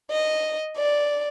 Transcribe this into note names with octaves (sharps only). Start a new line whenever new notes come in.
D#5
D5